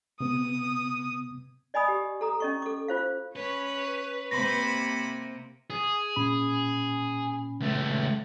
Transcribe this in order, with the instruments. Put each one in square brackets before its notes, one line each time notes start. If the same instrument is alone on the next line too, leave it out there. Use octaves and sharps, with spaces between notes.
[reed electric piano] C3 B3 [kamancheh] D#6
[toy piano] D5 D#5 G#5 B5 D#6
G4
A4 A#5 D#6
C#4 D#5 C#6
A4 D6
F4 C5 F5
[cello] C#4 [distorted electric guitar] B4 [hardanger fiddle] C#5
[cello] C3 A#3 [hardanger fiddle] C5 B5 [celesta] A#6
[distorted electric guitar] G#4
[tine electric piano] A#2 C#4 B5
[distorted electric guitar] C#2 A3